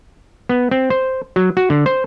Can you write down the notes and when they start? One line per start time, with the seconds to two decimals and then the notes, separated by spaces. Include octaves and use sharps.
0.49 B3
0.71 C4
0.90 C5
1.36 F#3
1.57 F#4
1.70 D3
1.86 C5